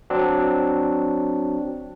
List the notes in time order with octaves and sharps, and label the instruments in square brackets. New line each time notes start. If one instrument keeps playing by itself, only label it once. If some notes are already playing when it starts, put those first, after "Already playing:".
[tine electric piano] F#3 C4 D4